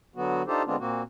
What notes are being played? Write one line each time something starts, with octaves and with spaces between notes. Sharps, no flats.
D3 F#3 B3 F#4
D4 D#4 F4 G4 A4 C5
D3 G#3 B3 C4 D4 F4
A#2 A#3 C4 F#4